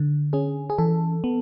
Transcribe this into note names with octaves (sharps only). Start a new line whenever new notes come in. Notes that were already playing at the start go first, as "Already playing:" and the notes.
Already playing: D3
C#4 G#4
G#4
E3 A4
B3